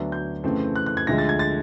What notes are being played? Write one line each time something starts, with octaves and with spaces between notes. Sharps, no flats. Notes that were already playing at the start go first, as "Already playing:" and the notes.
Already playing: D2 D3 F#3 B3 D4
G6
F2 C#3 E3 A3 C4
F#6
F#6
G#6
D2 D3 F3 G#3 A#6
A6
G#6
A6